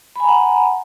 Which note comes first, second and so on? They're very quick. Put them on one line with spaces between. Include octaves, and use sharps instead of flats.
B5 G#5 A#5 F#5